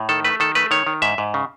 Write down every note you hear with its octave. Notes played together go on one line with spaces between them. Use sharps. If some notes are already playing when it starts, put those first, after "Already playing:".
Already playing: A2
D#3 A4
A3 B4
D#3 A4
A3 B4
D#3 C#5
D#3
G#2 E5
G#2
C#3